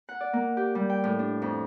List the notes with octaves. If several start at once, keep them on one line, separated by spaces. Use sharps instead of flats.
F#5
D5
A#3
G4
G3
G5
A2
D4
F2